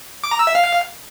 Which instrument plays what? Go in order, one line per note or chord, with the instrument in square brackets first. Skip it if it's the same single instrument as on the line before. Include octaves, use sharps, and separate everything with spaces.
[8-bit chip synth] D6
A#5
E6
E5
F5